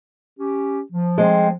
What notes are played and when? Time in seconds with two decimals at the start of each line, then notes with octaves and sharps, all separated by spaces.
0.38 C#4 G4
0.92 F3
1.18 G#3 C4